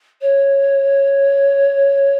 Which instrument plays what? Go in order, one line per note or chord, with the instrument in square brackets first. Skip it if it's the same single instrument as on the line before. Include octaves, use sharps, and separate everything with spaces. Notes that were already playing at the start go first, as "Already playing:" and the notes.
[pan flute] C#5